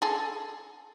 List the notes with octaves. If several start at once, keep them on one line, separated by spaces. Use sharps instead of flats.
G#4 A4